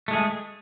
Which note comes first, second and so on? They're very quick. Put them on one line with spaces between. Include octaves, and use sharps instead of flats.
A3 G#3 G#4